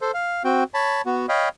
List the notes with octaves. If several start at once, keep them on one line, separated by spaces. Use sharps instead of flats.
A4 C5
F5
C4 F#4 G5
C#5 A5 B5
B3 F#4
C#5 D#5 F5 G5 B5